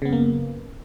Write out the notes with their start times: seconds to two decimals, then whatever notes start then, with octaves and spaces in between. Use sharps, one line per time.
0.02 C#3
0.05 B3
0.09 F#2
0.13 A#3